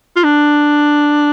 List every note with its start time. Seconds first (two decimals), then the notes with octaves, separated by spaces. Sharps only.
0.16 F4
0.24 D4